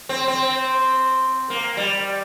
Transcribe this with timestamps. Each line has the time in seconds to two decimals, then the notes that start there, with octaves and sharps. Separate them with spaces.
0.09 C4
0.28 C4
1.50 A#3
1.77 G3